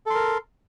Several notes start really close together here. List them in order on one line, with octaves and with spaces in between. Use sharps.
A4 C6 A#4